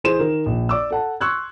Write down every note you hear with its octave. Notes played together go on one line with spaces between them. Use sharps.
E3 G#4 C5 C6 E7
D#3 A#4
A#1
D5 D6 E6
A4 F#5 A5
C6 C#6 E6 F#6 G#6